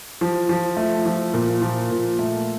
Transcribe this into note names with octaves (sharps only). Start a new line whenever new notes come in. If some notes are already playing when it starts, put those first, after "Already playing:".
F3
F3
A3
F3
A#2
F3
A#2
A3